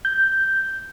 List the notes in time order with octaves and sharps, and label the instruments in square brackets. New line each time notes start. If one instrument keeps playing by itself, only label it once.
[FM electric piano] G6